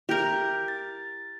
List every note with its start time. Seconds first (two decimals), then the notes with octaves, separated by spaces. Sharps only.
0.09 E4 G4 A#4 G6
0.68 A6